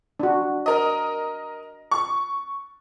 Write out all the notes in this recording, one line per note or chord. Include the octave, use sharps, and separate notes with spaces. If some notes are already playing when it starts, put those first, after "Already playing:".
D4 F#4
A#4 D#5
C#6